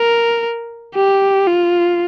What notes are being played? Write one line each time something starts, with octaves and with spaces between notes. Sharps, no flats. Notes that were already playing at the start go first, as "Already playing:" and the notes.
Already playing: A#4
G4
F4